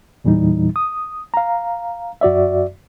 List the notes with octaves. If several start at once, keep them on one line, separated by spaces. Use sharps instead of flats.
E2 A#2 E3 G3 D#4
D#6
F5 A#5
F#2 F#4 D5 E5